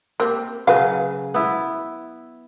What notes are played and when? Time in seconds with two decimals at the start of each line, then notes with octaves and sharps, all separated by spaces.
0.20 A#3 C4 G4
0.67 C#3 F#3 B4 F5
1.34 B3 E4